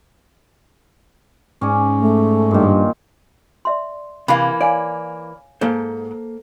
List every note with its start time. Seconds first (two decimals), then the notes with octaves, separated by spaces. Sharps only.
1.61 G#2 C#4 D5
1.99 A3
2.51 G2 A#2 D#3
3.65 D5 E5 C6
4.28 C3 E3 A#3 F5 B5
4.61 C#5 D5 F5 G#5
5.61 G#2 A#3 A4 C5